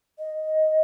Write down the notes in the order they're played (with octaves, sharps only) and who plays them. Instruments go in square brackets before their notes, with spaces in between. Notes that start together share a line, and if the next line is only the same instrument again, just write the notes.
[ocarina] D#5